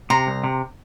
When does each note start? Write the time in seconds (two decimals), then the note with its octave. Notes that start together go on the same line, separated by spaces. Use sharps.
0.10 C3 A#5 C6
0.27 C2
0.44 C3